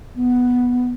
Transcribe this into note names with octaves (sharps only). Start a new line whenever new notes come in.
B3